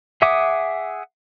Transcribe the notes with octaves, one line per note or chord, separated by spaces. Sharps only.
G#4 E5 F#5 D6 D#6